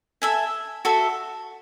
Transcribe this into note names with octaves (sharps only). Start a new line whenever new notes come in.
A4 E5 G#5
F#4 A4 E5